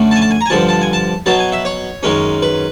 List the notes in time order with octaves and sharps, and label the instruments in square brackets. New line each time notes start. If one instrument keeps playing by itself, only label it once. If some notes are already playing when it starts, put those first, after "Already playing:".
Already playing: [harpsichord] F#2 D3 F#3 A3
A5
G#5
A5
G#5
A#5
G#5
G2 D3 F3 A5
A5
G#5
A5
B2 F#3 B3 A5
G#5
E5
C#5
F#2 D#3 G#3 C#4
B4